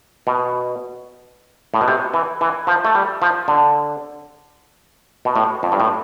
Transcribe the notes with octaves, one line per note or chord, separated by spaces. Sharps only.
B2
A2
B2
C3
E3
E3
F3
A3
G3
F3
D3
B2
A2
F2
G2
A2